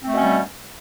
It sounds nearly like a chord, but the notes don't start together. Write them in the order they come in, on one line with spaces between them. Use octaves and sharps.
C4 A3 B2 C#4 G3